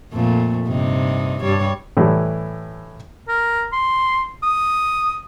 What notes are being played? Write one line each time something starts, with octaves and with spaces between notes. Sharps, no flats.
F2 A#2 A3
G2 C3 D#4
G2 G3 C#5
A2 E3 G3
A#4
C6
D#6